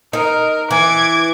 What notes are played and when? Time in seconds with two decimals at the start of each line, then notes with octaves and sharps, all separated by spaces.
0.13 D#4 A#4
0.71 E3 D6 G#6